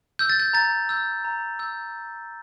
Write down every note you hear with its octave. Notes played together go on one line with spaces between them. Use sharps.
E6 G6
A6
G6
A#5 A6
E6 G6
A#5
E6 G6